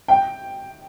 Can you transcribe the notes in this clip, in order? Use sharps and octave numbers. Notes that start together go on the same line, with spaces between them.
G5